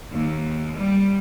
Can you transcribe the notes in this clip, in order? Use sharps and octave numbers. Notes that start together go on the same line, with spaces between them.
D#2
G3